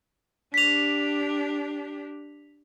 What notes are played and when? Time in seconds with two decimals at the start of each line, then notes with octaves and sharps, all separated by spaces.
0.54 D4 G4 B6 F7